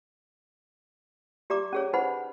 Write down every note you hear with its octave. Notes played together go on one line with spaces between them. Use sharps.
G4 D5 A#5 D6
C#4 G#4 C#5
D#4 B4 C5 F#5 B5